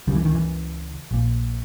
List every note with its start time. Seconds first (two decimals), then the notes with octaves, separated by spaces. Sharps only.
0.07 C#2 C#3 G3
0.15 E3
0.25 D#3
0.35 E3
1.11 A#1 A#2